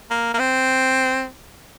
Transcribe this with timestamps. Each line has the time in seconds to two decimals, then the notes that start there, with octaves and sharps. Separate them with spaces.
0.11 A#3
0.34 A#3
0.39 C4